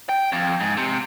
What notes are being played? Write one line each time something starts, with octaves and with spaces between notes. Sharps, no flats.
G5
F2
G#2
C3